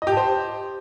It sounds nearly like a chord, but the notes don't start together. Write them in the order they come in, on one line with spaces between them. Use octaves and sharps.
D#5 G4 A5 C5